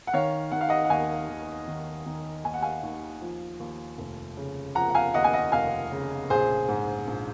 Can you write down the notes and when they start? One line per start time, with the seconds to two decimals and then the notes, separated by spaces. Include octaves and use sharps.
0.07 F#5
0.13 D#3 C#5 F5
0.52 D#3 F#5
0.61 F5
0.69 D#5 F#5
0.85 F#5
0.90 D#2 F5 G#5
1.29 D#2
1.68 D#3
2.06 D#3
2.44 D#2 G#5
2.54 F#5
2.63 F5 G#5
2.84 D#2
3.22 F3
3.60 D#2
3.98 F1
4.37 C#3
4.75 F3 F#5 A#5
4.90 F#5
4.95 F5 G#5
5.14 D#2 D#5 F#5
5.24 G#5
5.33 D#5 F#5
5.52 F1 F5 G#5
5.92 C#3
6.30 A#1 G#4 C5
6.68 G#2
7.07 A#1